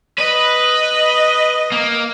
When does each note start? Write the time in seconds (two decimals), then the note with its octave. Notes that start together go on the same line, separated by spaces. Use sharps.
0.18 B4 D#5
1.72 A#3